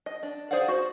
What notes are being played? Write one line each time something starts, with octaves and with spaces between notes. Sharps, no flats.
D#5
D4
G#4 C5 D5 F5 F#5
F#4 C5